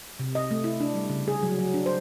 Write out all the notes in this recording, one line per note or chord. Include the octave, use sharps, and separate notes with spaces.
C3
D#5
A3
E4
D4
G3
C#3
G#4
F#3
F#3
D4
C5